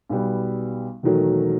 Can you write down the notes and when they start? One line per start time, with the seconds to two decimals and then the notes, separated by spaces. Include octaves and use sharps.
0.10 B1 B2 G3 B3
1.03 E1 D#3 F#3 A3